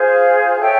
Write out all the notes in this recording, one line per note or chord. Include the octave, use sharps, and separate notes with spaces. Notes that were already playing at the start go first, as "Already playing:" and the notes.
Already playing: F4 G#4 C5
A4 C#5 E5 G5